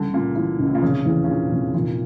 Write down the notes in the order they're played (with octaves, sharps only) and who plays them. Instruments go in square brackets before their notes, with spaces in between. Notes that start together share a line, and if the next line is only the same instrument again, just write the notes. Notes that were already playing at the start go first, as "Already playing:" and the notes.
Already playing: [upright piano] C#2 E3 G3 [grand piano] D3
[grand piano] A#2 [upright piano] C#3
[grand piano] A#2 [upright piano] E3
[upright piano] C#2
[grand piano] A2
A#2
[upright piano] F1 [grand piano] C#3
[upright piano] E2
[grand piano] C#3
[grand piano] A#2 [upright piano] D3
[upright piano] F1
[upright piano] F1 [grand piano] A#2